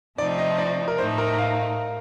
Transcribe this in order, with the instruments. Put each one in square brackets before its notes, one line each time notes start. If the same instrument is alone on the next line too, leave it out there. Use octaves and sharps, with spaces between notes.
[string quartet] C3 F3 A3 D#4 [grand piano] D5
[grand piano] D#5
D5
A#4
[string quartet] A2 A3 D#4 [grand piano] C5
[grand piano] A#4
F5